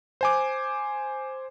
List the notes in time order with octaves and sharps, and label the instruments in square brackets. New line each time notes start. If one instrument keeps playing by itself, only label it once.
[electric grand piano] C5 G#5 D6